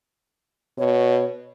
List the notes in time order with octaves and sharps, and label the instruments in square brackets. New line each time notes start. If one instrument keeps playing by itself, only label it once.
[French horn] B2 [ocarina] C#5